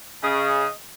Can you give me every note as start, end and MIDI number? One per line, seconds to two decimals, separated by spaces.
0.24 0.66 49
0.24 0.66 68
0.24 0.71 75